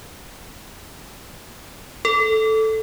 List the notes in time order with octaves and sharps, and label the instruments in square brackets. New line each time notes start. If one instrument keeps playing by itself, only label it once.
[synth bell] A4